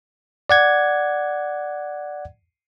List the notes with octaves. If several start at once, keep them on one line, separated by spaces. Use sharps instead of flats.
D5 F#5 G#6